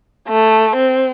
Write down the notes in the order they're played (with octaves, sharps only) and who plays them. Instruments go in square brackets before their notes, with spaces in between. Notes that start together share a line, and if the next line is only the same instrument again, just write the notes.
[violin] A3
C4